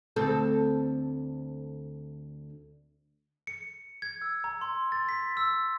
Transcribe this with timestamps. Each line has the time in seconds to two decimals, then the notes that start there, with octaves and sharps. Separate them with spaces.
0.16 D2 C4 A4
3.47 C#7
4.02 G#6
4.22 E6
4.44 A#5
4.61 C6
4.92 A6
5.09 B6
5.37 E6